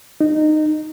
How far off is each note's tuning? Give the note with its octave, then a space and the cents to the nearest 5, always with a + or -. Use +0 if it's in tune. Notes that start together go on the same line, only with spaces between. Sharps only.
D#4 -20